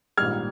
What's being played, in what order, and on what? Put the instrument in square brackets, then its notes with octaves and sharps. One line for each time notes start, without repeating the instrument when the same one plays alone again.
[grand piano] A#1 G#2 D#3 G3 F6 G#6